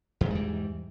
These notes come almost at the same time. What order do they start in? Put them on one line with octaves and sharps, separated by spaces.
E2 G#2 G3 E3